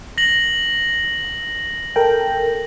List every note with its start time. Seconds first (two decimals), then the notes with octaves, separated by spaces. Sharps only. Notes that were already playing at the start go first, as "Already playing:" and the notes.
0.18 A#6 F#7
1.96 A4 A#4 G5